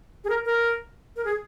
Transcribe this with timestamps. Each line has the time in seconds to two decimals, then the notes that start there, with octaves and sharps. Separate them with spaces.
0.24 G#4
0.29 A#4
0.45 A#4
1.16 A#4
1.25 G#4